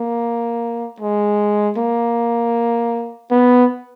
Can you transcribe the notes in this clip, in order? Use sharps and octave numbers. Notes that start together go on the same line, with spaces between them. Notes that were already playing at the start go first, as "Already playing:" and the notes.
Already playing: A#3
G#3
A#3
B3